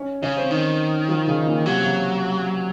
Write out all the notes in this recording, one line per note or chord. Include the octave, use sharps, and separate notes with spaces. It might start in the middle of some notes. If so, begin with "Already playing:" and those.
Already playing: C#4
C#3 C#4
C4
D#3
F3
C#3
A#2
C3 F#3
C#3